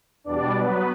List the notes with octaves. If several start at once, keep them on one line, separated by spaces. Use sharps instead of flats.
E2 B2 G3 D4 D5
B2 F#3 B3 B4